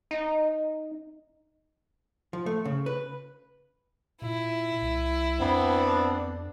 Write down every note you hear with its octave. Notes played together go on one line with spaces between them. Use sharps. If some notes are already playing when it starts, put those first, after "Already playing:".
D#4
F3
A3
C#3
B4
A#2 E4
C2
F2 B3 C4 D4